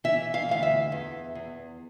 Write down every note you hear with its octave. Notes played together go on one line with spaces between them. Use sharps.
E3 E5
F5
D2 F5
E5
E2
E2